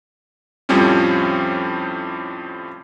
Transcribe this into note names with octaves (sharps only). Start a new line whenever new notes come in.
F2 A2 F3 G3 C4 C#4